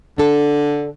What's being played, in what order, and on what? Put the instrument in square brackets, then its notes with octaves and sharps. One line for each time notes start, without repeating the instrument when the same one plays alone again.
[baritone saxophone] D3 [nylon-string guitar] D4 A4